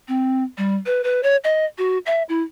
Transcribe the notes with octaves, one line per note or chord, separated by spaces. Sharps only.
C4
G3
B4
B4
C#5
D#5
F#4
E5
E4